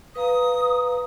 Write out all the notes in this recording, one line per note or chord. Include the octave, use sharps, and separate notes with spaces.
B4 F5 A#5 D#6